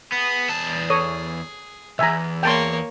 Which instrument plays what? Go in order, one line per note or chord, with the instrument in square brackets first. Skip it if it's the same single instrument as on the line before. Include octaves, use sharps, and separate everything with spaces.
[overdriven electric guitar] B3 [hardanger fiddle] G#4
[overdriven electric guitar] E2 A5
[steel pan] A4 C#5 D#6
[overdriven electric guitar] B1 E2 [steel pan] E5 G#5 A#5
[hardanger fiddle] A#3 C#5 [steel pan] G5 A5 C6